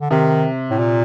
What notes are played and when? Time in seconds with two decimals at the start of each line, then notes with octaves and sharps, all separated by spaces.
0.01 D3
0.11 C3 D#3
0.70 A2
0.78 A#2